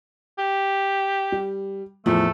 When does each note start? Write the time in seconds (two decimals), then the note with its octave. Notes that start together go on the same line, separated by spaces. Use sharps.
0.39 G4
1.32 G3
2.06 E2 A2 F3 A3